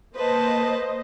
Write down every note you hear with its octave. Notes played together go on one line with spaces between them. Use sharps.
A#3 B4 C5 D#5 A5